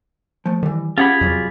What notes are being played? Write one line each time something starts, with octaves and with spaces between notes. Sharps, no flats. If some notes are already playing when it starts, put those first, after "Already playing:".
F3 A3
D#3 E3 G3
C#4 F4 G4 G#4 F#5 B5
F2 C3 F#3 G3